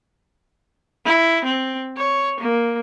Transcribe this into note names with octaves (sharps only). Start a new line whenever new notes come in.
E4
C4
C#5
A#3